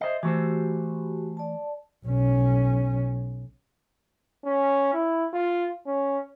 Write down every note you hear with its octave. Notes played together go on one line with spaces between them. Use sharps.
C5 D#5 E5
E3 A3 F#4 G4 C5
D5 A5
B1 C#4
C#4
E4
F4
C#4